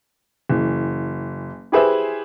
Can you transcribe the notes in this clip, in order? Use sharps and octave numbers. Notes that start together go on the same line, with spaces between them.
F#1 E3
E4 G4 G#4 B4 C5 E5